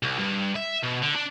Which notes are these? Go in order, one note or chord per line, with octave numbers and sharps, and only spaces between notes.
C2
G2
E5
B2
D3
D4